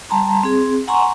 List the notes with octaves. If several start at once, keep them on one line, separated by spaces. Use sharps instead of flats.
G3 A5 A#5 C6
C4 G#4
F#5 G#5 A#5 C6 C#6